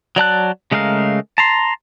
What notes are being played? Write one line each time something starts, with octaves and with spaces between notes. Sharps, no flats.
F#3 D5 A5 F#6
C#3 G#3 A3 A#4 F5
A5 A#5 C6